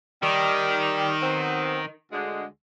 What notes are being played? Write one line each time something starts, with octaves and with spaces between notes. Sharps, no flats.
D#3 G3
F#3 B3 C4
D2 D3 G#3